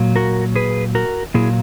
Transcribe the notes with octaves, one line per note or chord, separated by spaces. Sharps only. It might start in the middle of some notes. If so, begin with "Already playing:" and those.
Already playing: A#2 F#3 A#3
F#4 A#4
G#4 B4
F#4 A#4
A#2 F#3 A#3 E4 G#4